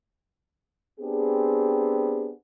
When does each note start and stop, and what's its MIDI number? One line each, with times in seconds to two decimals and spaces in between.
1.00 2.32 59
1.00 2.32 60
1.00 2.32 62
1.00 2.32 67
1.00 2.32 68